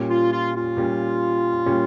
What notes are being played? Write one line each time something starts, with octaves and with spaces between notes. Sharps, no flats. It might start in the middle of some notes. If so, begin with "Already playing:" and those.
Already playing: A#2 G3 C#4
F4
F4
F4
A#2 G3 C#4
A#2 G3 C#4